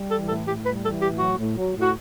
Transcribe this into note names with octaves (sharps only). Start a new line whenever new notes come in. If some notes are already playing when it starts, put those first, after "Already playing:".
Already playing: G3
E3 A4
A2 A4
A2 G4
G3 B4
E3 A4
A2 G4
F#3 F#4
A2
F#3
A2
F#4